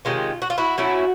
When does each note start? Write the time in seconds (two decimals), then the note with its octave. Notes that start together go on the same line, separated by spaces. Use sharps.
0.05 C3 D#3 G#3 C#4 F4
0.42 F#4
0.50 F4
0.58 E4 F#4
0.78 F#3 A3 C#4 E4